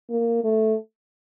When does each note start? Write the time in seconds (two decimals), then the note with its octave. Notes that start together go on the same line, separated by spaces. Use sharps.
0.10 A#3
0.44 A3